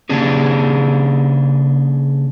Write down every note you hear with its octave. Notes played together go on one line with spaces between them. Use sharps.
C#3 A#3 C#4 D4 G4 G#4